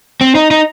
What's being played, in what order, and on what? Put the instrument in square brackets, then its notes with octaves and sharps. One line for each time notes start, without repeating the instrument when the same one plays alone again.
[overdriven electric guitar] C4
D#4
D#4